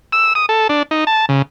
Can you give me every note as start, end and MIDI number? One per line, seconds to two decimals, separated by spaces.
0.13 0.33 88
0.35 0.46 87
0.49 0.67 69
0.69 0.83 62
0.91 1.04 63
1.07 1.26 81
1.29 1.42 49